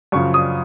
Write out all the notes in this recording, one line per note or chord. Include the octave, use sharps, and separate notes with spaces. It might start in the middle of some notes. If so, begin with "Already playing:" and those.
F#2 C#3 F3 C#6
D#6